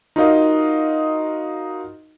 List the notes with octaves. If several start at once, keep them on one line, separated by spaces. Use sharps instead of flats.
D#4 F4 F#4 A#4 D#5 F5